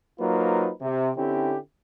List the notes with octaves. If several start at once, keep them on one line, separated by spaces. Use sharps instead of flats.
F#3 A#3 D#4 F4 B4 C5
C3
D3 C4 C#4 E4 G4